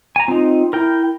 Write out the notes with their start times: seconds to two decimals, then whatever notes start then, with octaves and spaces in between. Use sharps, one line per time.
0.16 G#5 A#5
0.28 C4 D#4 F4
0.73 E4 A#4 G5